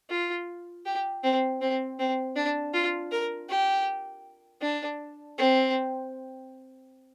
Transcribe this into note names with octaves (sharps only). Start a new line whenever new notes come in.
F4
G4
C4
C4
C4
D4
F4
A#4
G4
D4
C4